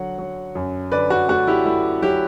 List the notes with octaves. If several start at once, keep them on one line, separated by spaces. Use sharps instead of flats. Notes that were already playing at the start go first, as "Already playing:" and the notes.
Already playing: D3 F#3 F#5
F#3
F#2
D3 B4 D5
F#4
A3 F#4
E4 G4
A3 E4
F#3 E4 G4